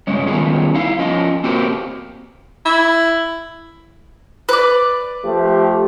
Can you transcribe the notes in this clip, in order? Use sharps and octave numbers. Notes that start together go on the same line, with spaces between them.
G2 C#3 G#3 C#4
D#3 G3 B3 C#4 F4 G#4
D#4 E4 F5
F3 C#4 F4 D#5
A#3 C4 F#4 G4 A#4 C5
E4
B4 D5
F3 A3 G4